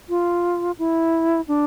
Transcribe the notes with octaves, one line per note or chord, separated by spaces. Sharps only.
F4
E4
D4